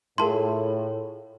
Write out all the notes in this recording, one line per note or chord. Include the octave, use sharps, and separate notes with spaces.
A2 E4 F4 G#4 A#4 A5 C6